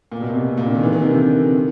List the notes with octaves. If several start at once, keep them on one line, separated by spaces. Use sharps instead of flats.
A#2
B2
C3
C3
A#2
D3
D#3
E3
D#3
C3
D3
D#3